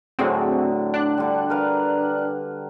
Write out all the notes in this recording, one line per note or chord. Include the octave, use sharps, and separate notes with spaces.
A2 D3 F#3 C4 F#4 G#4
D4 F#6
D3 G3
A#4 B4 F5